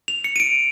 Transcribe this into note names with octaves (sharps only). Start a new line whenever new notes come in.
F7
C#7
D#7
D7